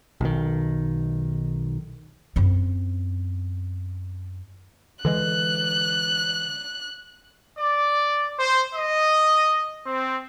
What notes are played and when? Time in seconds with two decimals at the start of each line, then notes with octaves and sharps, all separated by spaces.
0.21 B1 D#3
2.36 F#2 C4
5.05 D3 E3 G#3 F#6
7.59 D5
8.39 C5
8.74 D#5
9.86 C4